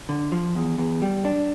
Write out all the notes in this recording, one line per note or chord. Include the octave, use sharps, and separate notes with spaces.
D3
F3
E2
E2
G3
D4